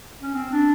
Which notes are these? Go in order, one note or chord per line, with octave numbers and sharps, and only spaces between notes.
C#4
C4
D4